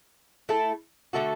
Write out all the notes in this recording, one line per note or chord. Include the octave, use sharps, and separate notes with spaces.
A3 E4 A4
D3 A3 F#4 A4